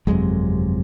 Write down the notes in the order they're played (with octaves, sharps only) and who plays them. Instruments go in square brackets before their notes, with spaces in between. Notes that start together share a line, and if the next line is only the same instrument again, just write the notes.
[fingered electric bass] G1 F2 C3 F#3 G#3